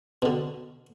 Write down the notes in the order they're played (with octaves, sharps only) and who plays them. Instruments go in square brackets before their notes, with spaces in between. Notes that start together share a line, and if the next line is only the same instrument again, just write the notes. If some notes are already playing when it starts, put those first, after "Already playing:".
[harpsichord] B2 D3